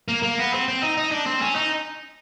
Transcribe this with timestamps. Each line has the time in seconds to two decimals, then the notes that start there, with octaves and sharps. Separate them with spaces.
0.08 A#3
0.23 A#3
0.39 B3
0.53 C4
0.68 C4
0.83 D#4
0.97 D#4
1.12 D4
1.27 C4
1.42 C#4
1.56 D#4